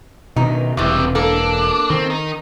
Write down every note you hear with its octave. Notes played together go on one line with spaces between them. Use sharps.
B2 D3 D#3 D#4
E1 C#2 C3 E3 G3
A#3 D4 A4
D#3 C4
D#4